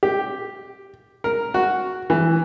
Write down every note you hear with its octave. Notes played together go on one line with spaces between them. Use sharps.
G4
A#4
F#4
E3